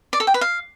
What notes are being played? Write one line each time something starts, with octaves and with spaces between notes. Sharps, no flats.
D5
A4
G5
B4
F5